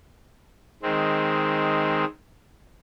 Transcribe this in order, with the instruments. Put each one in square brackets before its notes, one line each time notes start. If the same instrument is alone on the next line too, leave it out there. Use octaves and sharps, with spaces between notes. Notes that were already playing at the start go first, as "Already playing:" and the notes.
[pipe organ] D#3 G#3 C4